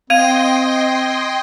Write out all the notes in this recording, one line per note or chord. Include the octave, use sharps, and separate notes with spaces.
C4 D#5 F5 G5 C6 G#6 D#7